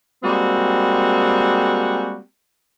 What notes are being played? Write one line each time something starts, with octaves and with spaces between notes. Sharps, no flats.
G3 G#3 A#3 C4 F#4